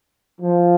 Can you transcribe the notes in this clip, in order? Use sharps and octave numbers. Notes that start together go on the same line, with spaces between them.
F3